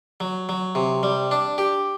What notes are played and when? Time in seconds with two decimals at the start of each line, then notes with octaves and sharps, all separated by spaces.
0.20 F#3
0.49 F#3
0.75 C3
1.03 G3
1.31 D4
1.58 G4